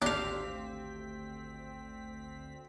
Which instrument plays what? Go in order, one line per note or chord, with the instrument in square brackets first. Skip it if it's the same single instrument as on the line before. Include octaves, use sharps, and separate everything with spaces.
[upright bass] G#1 E4 [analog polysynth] D2 C4 B6 [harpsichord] D4 [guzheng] G4 F5